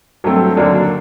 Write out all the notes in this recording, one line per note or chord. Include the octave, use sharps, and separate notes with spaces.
G2 F#3 A3 C4
D#2 D3 F#3 A#3 D4